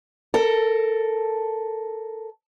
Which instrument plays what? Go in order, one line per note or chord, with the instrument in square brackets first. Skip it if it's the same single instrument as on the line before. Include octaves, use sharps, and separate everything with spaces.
[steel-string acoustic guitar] A4 A#4